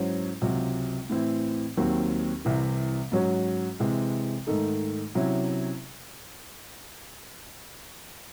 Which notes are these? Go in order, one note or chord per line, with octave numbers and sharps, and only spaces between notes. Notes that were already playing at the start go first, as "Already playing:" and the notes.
Already playing: G#2 F#3 C#4 E4 C5
C#2 C3 F#3
A2 E3 C4 E4
D#2 D#3 F#3 C4
C2 C3 E3
G#2 F#3 C#4 F#4
C3 E3 G#3
G#2 D#3 A3 D#4 A4
C3 F#3 C#4 E4